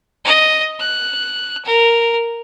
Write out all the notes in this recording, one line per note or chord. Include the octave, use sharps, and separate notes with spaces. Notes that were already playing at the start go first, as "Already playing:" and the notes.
D#5
F#6
A#4